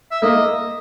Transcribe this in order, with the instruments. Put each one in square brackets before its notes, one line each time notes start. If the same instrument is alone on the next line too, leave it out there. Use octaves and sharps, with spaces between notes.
[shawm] E5
[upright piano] A#3 [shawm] D#5